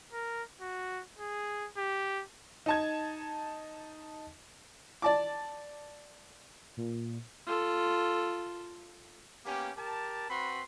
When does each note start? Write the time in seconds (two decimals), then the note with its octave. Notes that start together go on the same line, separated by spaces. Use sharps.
0.13 A#4
0.61 F#4
1.18 G#4
1.77 G4
2.66 D#4 A5 G#6
5.02 D5 A5 D6
6.77 A#2
7.47 F4 A4
9.46 A#3 B3 C#4 G4
9.77 G4 A#4 A5
10.30 C4 F#4 B4 B5 C6